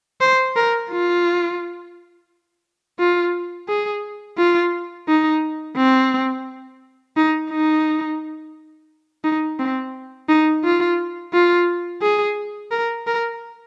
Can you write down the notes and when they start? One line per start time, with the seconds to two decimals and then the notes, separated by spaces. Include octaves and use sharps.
0.21 C5
0.56 A#4
0.91 F4
2.99 F4
3.68 G#4
4.37 F4
5.08 D#4
5.77 C4
7.16 D#4
7.51 D#4
9.24 D#4
9.59 C4
10.28 D#4
10.64 F4
11.33 F4
12.02 G#4
12.72 A#4
13.07 A#4